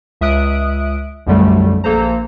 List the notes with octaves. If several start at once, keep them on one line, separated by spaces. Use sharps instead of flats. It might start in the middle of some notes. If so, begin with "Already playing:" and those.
C#2 E5 D#6 F#6 D7
B1 F#2 D3 G3 A3
A#1 A#3 A4 C5 A#5